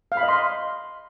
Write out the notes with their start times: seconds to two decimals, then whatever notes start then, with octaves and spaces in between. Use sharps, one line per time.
0.12 F5
0.17 B5
0.23 D#5
0.28 C6